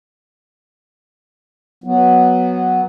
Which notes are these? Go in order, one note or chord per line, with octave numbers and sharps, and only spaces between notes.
F#3 B3